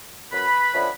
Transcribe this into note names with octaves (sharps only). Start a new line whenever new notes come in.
F#2 B4 B5
D3 F3 A3 C#4